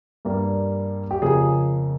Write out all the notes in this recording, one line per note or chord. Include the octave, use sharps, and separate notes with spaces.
G2 G3 A#3
G4
F2 C#3 F3 A#3 G#4